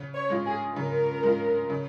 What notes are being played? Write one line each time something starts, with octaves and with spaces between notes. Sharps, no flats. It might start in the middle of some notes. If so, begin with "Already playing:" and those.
Already playing: C#3
C#5
G#3 F4
G#4
C#3 A#4
G#3 F4
C#3